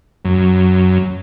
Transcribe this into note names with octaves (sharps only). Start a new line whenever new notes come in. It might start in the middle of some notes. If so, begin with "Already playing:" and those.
F#2